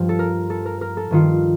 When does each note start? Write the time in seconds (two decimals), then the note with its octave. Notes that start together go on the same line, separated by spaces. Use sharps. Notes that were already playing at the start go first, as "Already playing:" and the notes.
Already playing: G2 F3
0.09 A4
0.19 A#4
0.50 A4
0.65 A#4
0.81 A#4
0.97 A4
1.11 G2 D#3 F4